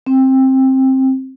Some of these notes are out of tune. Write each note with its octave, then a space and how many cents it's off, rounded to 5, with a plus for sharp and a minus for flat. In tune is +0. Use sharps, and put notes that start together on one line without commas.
C4 +15